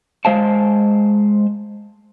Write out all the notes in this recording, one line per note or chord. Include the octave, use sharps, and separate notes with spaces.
G#3 C5 F5 A5